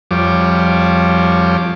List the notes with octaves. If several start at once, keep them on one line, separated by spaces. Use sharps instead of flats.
F2 F3 G3 C#5 D6